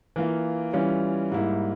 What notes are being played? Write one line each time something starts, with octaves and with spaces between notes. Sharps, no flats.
E3 A#3 F4
E3 G3 C#4 F4
G#2 G3 A#3 E4